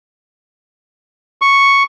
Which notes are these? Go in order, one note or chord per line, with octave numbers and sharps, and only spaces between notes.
C#6